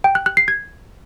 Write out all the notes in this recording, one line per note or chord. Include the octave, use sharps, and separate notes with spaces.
G5
F#6
F#6
C7
G#6